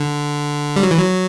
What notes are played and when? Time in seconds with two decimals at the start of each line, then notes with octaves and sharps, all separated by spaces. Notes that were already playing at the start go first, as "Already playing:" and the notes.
Already playing: D3
0.76 G3
0.83 F#3
0.91 E3
0.98 F#3